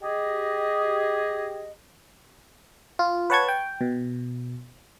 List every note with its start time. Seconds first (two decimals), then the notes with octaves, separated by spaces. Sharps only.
0.02 G4 G#4 D#5
2.99 F4
3.30 B4 C#5 F#5 A5 C#6 G#6
3.49 G5
3.81 B2